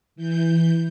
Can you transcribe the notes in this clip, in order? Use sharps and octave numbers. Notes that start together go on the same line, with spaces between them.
E3 G6